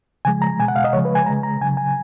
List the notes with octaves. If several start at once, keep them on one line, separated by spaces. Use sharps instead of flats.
C#3 F3 G#3 G#5
A#5
B2 G#3 G#5
F#5
F5
D#5
C#3 F3 G#3 C#5
B4
G#5
C#3 G#3 A#5
A#5
C#3 F#3 G#5
G#5